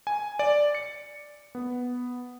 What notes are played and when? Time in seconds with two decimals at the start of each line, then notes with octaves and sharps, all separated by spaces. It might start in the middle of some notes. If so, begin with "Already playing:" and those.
0.07 G#5
0.39 D5
0.75 C#7
1.55 B3